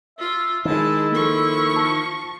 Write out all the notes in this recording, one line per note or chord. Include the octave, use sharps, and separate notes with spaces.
F4 E5
D#3 G#3 E4 A5
F3 A#3 A4 C#6
A5 C#7